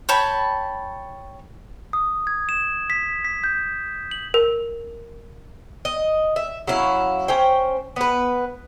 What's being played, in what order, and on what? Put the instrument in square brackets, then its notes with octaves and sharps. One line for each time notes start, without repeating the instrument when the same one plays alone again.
[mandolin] C#5 G5 A5 B5
[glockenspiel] D#6
G#6
E7
B6
B6
G6
F#7
[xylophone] A#4
[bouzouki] D#5
E5
F#3 C#4 E4 F5
C#4 C5 G5
B3 B4